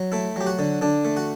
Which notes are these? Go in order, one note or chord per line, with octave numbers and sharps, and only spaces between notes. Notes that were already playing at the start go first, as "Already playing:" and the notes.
Already playing: F#3
A3 E4
F#3 G4
F#4
D3
D3 D4
A3
F#4